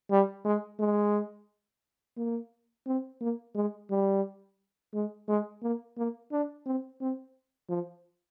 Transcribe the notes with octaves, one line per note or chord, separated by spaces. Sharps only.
G3
G#3
G#3
A#3
C4
A#3
G#3
G3
G#3
G#3
A#3
A#3
D4
C4
C4
F3